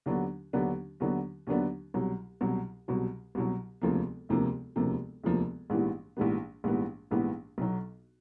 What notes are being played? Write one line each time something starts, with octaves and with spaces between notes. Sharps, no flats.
D#2 D3 F#3 B3 D4
D#2 D3 F#3 B3 D4
D#2 D3 F#3 B3 D4
D#2 D3 F#3 B3 D4
C2 B2 F#3
C2 B2 F#3
C2 B2 F#3
C2 B2 F#3
E1 D2 C3 F3 A#3
E1 D2 C3 F3 A#3
E1 D2 C3 F3 A#3
E1 D2 C3 F3 A#3
A#1 G#2 E3 G3 B3
A#1 G#2 E3 G3 B3
A#1 G#2 E3 G3 B3
A#1 G#2 E3 G3 B3
B1 B2 F#3